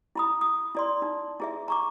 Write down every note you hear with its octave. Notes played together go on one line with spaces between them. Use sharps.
E4 B5 D#6
D#6
E4 D5 C6
D#4
E4 G#4 E5
A#5 C#6 D6